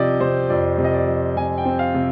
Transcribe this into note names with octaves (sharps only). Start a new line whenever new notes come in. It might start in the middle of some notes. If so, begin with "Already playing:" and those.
Already playing: C3 F3 D5 D#5
C3 C5
F2 D5
C3
D#5
D5
F3
C3 G#5
G5
C4
F5
C3